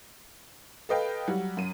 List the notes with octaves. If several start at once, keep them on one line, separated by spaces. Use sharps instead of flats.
A4 B4 D#5 F5 G5
F#3 G3 F#5
F#2 D#7